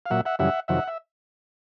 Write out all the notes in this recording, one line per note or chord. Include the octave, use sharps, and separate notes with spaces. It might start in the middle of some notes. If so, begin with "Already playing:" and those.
F5
A#2 F#3 E5 F#5
E5 F#5
F#2 C#3 E3 G3 E5 F#5
F2 C3 D#3 F#3 E5 F#5
E5